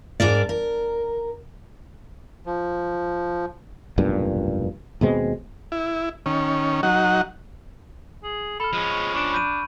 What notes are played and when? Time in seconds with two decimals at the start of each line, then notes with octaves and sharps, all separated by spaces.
0.20 G#2 D4 A#4 D5
0.49 A#4
2.46 F3
3.98 F1 B1 G2 A#2
5.01 D#2 B2 G#3 C4
5.72 E4
6.26 D#3 C#4
6.83 F#3 D#4 F#5
8.23 G#4
8.60 A4 B5 F6
8.73 F3 G#3 C#4
8.91 C#6
9.15 D4 C#6 D7
9.32 B5 G6 D#7